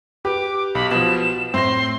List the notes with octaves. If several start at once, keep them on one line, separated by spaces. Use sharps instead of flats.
G4 B4 D6
B1 B5
B2 F3 E7
A2 C4 C6 A#6